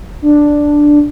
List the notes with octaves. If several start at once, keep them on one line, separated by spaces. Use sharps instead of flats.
D4